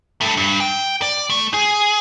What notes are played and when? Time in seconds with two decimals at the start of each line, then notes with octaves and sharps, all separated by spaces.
0.21 G2 A3
0.37 G2
0.60 G5
1.02 D5
1.30 A3
1.54 G#4